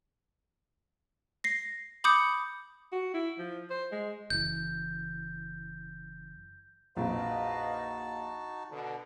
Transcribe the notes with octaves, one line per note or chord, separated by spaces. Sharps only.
A#6 C7
B5 D6 D#6 G6 C#7
F#4
E4
F3
C5
G#3
F#1 E3 G6
A#1 F2 D#4 F#4 B4 D#5 F5 A5
B2 D3